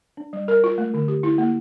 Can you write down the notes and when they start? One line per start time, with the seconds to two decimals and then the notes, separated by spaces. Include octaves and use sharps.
0.17 D4
0.33 G3
0.48 A#4
0.64 F4
0.78 A3
0.94 D3
1.08 G4
1.23 E4
1.38 A#3